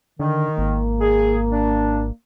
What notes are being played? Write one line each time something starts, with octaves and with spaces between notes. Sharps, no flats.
D3 D#3
G#1 A#3
G#4
D4